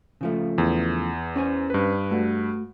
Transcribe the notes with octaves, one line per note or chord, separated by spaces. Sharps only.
C#3 F3 A3
E2
C#4 C5 G#5
G2 B4
A3 F#4